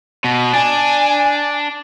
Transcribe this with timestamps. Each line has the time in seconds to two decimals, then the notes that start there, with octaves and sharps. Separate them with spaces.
0.24 B2
0.53 D4 G#5